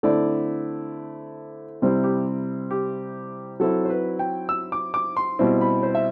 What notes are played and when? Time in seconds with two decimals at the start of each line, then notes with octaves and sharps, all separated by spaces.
0.03 D3 A3 C4 E4 D5
1.82 C3 G3 C4 E4
2.04 G4
2.71 G4
3.60 F#3 C4 E4 A4
3.85 C5
3.90 B4
4.19 G5
4.49 E6
4.72 D6
4.94 D6
5.17 C6
5.39 B2 G3 C4 E4
5.61 B5
5.83 C5
5.95 E5